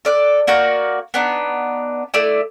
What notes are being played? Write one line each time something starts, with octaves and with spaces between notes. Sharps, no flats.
A4 D5 F#6
A#3 F#4 D5 G6
B3 D4 D#4
A3 E4 D5 E6